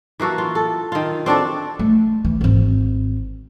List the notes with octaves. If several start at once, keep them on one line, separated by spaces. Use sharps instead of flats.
E3 A#3 F#4 A4
F4
A4
D#3 F4
C4 D4 F#4 A4
A3
E3
G#1 C4